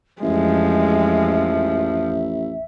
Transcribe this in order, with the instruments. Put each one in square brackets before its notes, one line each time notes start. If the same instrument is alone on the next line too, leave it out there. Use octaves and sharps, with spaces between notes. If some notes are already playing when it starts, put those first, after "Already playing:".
[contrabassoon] A1 [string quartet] F2 F3 [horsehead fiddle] G#3 [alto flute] E5